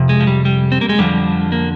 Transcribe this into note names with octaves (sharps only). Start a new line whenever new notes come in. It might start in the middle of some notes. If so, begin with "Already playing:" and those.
Already playing: F2 C3
G#3
F3
G3
G3
C4
A#3
G#3
F2 D3 F3 G3
A#3